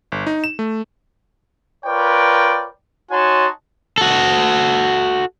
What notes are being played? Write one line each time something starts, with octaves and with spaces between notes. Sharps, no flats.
G1
D#4
E7
A3
F4 A#4 B4 C#5 D5 G5
D#4 F#4 C#5 G#5 A5 C6
F#4 A4